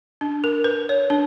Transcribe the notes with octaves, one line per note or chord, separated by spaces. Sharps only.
D4
A#4
B4
C#5
D4